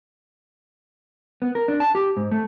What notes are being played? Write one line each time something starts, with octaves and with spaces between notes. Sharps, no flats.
B3
A#4
D4
A5
G4
G#2
A3